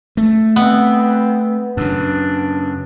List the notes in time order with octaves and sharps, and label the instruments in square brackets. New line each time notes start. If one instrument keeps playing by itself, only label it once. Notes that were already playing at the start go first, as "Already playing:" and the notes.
[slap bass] A3
[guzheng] B3 [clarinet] C4
[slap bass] F#2 C#3 [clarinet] D4